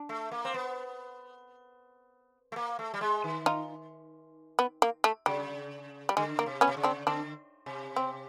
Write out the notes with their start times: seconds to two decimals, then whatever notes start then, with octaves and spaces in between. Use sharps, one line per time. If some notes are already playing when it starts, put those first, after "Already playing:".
Already playing: D4
0.09 A3
0.31 A#3
0.45 C4
0.54 B3
2.52 A3
2.56 A#3
2.79 A3
2.94 G3
3.01 G#3
3.24 D#3
3.46 D#4 F4
4.59 B3
4.82 A#3
5.04 A3
5.26 C#3 G3
6.09 G3
6.17 D3 G#3
6.39 A#3
6.46 C3
6.61 B3 C#4
6.67 C3
6.77 C#3
6.83 C4 D4
7.07 D3 C4 D4
7.66 C3
7.96 C4